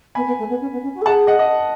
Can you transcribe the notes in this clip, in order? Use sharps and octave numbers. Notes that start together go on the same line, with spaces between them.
B3 G#5 B5
B3
A3
B3
C#4
B3
C#4
F#4
A4
G#4 F#5 A5
D#5 F#5
D#5